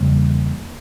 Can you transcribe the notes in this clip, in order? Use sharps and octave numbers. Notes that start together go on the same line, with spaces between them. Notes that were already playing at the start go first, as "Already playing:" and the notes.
Already playing: E2 C#3 G3 A#3